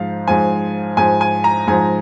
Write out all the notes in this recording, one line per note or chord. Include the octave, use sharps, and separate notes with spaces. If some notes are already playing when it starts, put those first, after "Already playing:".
Already playing: G#2 F3 F5
G#2 F3 G#5
G#2 F3 G#5
G#5
A#5
G#2 F3 G#5